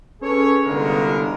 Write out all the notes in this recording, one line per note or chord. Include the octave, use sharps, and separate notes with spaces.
C#4 G#4 A4 B4 C#5
G1 C2 G2 D3 G#3 A#4